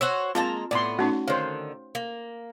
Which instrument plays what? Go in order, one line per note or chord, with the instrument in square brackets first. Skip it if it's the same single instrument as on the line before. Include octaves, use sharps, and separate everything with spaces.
[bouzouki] F#4 C5 C#5 [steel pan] E6
[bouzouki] G#3 A#3 A#5 [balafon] C4 [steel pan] F4 A5
[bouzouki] A2 B3 [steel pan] D5 C6
[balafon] A3 C#4 D#4 [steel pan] F#4
[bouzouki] D3 D#3 [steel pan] C5 F5 [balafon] C#5
[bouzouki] A#3